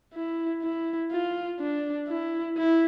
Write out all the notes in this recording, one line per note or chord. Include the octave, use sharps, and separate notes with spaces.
E4
E4
F4
D4
E4
E4